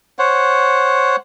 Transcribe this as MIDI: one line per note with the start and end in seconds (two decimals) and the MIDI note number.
0.19 1.16 72
0.19 1.16 73
0.19 1.16 78